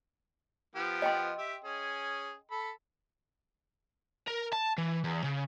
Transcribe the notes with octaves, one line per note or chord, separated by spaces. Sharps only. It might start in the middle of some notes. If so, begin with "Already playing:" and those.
F3 B3 G4
D#5 G5 C6
G4 E5
C#4 G#4
A4 B5
A#4
A5
E3
E2
C#3